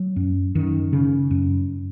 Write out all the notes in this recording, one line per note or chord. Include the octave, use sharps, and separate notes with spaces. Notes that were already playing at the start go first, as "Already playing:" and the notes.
Already playing: F#3
F#2
F#2 D#3
C#3
F#2